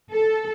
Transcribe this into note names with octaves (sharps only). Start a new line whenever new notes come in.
A4